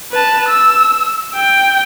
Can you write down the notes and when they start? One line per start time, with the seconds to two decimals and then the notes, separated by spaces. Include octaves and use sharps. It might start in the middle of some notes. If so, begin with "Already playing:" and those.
0.12 B4 A5
0.49 E6
1.35 G5